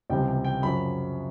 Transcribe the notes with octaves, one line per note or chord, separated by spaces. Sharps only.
C#2 C3 E3 G3 G5
G5
G5
F#2 C#3 F3 B5